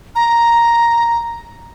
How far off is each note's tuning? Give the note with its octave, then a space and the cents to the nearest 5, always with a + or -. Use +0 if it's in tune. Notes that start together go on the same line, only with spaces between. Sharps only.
A#5 +5